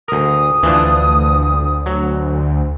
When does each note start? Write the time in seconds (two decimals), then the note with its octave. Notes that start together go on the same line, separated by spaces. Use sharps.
0.08 D2 A#4 D#6
0.63 D2 E3 F3 D4
1.86 F#3